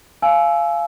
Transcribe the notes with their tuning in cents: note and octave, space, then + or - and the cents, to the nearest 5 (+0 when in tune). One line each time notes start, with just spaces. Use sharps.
F5 -20 G#5 +30 E6 +0